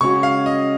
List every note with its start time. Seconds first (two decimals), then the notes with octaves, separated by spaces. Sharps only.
0.01 C#3 G#3 C#4 F#4 C#6
0.23 F5
0.46 D#5